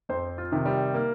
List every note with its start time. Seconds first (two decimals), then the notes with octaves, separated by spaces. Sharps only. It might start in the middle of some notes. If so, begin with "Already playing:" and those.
0.09 F2 C5
0.38 F4
0.52 C3 D#3
0.65 G3
0.94 A#3